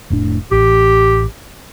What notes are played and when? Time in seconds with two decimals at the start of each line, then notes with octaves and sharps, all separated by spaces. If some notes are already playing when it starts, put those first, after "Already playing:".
0.10 F1 A2 D4
0.51 A1 G4